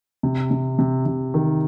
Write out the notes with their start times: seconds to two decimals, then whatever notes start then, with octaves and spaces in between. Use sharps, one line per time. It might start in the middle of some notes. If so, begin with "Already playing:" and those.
0.23 C3
0.51 C3
0.79 C3
1.06 C3
1.34 D#3